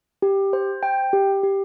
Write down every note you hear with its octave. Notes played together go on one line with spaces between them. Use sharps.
G4
C5
G5
G4
G4